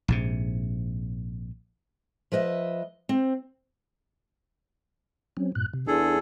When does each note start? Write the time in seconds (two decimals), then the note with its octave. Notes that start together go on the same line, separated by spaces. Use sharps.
0.08 A#1 G#2 C3
2.32 F3 B4 D#5 E5
3.09 C4
5.37 F#3 C4 C#4
5.55 G2 A#2 F#6
5.73 C3
5.87 E2 D4 G#4 A4